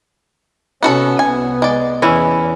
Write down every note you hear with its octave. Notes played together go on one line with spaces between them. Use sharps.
C3 B3 C#4 F#4 A4
C2 B3 G#5
G#3 D5
E2 E3 C#4 E4